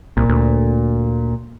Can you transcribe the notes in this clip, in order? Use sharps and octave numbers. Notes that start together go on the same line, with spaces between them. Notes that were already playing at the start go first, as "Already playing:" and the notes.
C2 A#2
D2